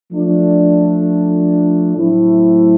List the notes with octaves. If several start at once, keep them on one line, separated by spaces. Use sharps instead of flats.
F3 A3 D4
A2 F#3 A3 C4 E4